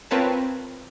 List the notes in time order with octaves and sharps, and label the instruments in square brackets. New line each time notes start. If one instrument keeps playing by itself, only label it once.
[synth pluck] C4 F4 A#4 B4 C#5 A5